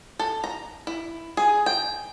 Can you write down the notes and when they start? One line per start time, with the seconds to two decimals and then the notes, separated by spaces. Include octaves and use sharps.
0.19 A4
0.44 A#5
0.87 E4
1.37 G#4
1.66 G5